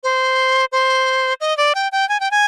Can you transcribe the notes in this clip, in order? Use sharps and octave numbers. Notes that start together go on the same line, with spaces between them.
C5
C5
D#5
D5
G5
G5
G#5
G5
G#5